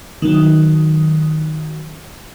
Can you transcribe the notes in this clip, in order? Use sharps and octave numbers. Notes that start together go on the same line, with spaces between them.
D#3 F#3